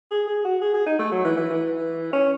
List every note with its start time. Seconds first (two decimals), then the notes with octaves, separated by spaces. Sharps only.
0.11 G#4
0.28 G#4
0.45 F#4
0.62 G#4
0.74 G#4
0.87 D#4
0.99 A3
1.12 F#3
1.25 E3
1.37 E3
1.51 E3
2.14 C#4